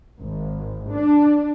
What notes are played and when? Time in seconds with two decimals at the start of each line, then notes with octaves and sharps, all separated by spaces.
0.21 G#1
0.91 D4